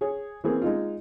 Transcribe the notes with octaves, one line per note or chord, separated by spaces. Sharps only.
G#4 C#5
E3 A#3 C4 G#4
G#3 D#4 F4